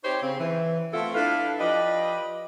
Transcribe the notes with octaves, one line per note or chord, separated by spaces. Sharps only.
C4 D#4 G4 C5 C#5
C#3 C4
E3
A3 B3 C4 E4 F4 A4
D4 E4 A4 B4 F5
F3 G4 B4 D5 D#5